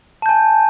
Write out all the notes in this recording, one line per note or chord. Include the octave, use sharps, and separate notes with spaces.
G#5 A5 G6